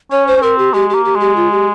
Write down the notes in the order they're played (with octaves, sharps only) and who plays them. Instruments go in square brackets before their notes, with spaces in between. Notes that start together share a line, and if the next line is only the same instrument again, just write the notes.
[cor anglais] C#4 [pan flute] C#5
[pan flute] C5
[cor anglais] C#4
[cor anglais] C4 [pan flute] A#4
[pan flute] G4
[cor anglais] G#3 [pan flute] G4
[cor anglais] A#3 [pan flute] G4
[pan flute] G4
[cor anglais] G#3 [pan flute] G4
[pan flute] F4
G4